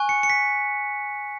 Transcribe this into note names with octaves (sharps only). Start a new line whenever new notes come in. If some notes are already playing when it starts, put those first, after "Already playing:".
Already playing: G#5 C#6 F#6
C#7
C#7
B6